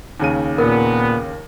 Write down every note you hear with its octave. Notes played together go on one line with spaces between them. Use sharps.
D#2 C#3 D#7
A#2 B3 A#4